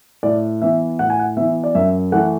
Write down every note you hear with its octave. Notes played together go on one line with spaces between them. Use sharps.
A2 D5
E3 B3 E5
A2 F#5
G#5
F#5
E3 B3 E5
D5
F#2 E5
E3 A3 F#5